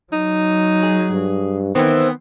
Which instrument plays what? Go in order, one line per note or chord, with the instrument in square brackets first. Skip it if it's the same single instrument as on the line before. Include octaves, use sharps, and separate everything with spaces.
[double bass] F#3 [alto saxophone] D#4
[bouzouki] G#4
[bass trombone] G2
[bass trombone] D#3 [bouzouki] E3 C4 [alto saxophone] B3